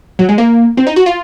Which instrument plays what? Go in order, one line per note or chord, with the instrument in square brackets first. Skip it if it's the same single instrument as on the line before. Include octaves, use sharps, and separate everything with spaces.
[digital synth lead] F#3
G#3
A#3
C4
D#4
F#4
F4